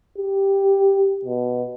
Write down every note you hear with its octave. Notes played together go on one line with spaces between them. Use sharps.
G4
B2